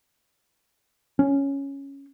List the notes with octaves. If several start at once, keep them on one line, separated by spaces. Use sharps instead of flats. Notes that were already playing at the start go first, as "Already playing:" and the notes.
C#4